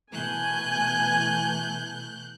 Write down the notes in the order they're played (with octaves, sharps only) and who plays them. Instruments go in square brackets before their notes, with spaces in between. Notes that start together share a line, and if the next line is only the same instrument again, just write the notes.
[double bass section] B2 E3 A3 [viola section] G#5 [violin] F#6 G6